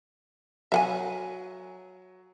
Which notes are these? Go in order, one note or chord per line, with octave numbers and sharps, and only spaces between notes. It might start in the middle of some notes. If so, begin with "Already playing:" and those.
F#3 E5 F#5 G#5